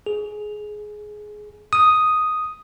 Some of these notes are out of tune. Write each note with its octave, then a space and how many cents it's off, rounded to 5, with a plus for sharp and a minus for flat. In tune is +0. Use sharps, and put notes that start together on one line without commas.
G#4 +15
D#6 +0